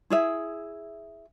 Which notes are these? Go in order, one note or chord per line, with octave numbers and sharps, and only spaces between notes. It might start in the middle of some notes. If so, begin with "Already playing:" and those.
E4 G#4 E5